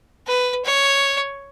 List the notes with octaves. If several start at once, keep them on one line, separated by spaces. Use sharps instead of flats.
B4
C#5